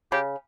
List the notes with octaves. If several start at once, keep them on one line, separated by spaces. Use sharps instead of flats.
C#3 G4